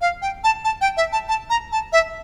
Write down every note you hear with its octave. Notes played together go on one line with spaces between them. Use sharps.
F5
G5
A5
A5
G5
E5
A5
A5
A#5
A5
E5